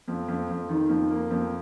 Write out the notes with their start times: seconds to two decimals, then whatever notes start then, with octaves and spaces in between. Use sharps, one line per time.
0.08 F2
0.28 F2
0.49 F2
0.69 D#3
0.89 F2
1.11 A#3
1.30 F2